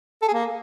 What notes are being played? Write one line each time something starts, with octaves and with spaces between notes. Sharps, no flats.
A4
G#4
A#3